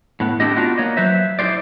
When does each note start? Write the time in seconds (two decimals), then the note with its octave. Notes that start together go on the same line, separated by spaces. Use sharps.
0.20 A2 B3
0.40 A3 C4 D4 E4 G4 D#5
0.56 B3 D4 D#4 F4 F#4
0.78 A#3 C#5 D#5
0.97 F#3 B4 C5 E5
1.39 D#4 E4 G4 G#4 C5 D5